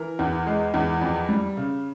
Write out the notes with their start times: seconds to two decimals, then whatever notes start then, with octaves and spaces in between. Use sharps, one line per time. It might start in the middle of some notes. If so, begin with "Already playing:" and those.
Already playing: E3 A#4
0.19 E2
0.47 G#3
0.74 E2
1.01 F2
1.29 G3
1.57 C#3